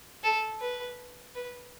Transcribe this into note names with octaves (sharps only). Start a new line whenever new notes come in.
A4
B4
B4